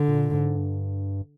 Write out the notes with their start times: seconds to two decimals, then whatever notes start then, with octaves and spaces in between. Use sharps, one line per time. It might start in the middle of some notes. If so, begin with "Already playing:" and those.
Already playing: D3
0.08 A#2
0.33 G#2
0.56 G2